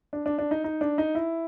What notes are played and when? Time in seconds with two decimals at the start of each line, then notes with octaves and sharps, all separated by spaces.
0.13 D4
0.26 D4
0.38 D4
0.51 D#4
0.64 D#4
0.81 D4
0.98 D#4
1.15 E4